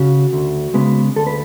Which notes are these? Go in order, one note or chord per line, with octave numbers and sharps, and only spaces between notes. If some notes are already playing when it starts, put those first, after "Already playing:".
Already playing: C#3 F#4
D2
C#3 G#3 B3
D2 A4
B4